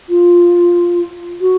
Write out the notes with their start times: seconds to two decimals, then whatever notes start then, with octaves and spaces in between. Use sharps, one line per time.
0.09 F4
1.41 F#4